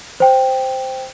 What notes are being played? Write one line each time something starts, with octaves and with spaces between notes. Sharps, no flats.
C5 G5